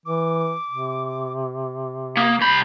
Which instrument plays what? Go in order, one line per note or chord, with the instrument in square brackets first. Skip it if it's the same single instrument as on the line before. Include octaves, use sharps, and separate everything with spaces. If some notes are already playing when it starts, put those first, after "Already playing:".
[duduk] E3 [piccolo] D6
[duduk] C3
[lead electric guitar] A#3 [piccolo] D#6
[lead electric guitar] C2 B5 [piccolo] G6